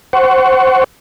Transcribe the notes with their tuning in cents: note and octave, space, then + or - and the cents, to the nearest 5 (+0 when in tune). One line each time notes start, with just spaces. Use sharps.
C5 +0 F#5 +25 C#6 +10